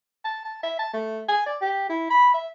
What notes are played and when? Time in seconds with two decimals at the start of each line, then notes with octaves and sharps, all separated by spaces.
0.24 A5
0.45 A5
0.63 E5
0.79 A5
0.94 A3
1.29 G#5
1.46 D5
1.61 G4
1.89 E4
2.10 B5
2.34 E5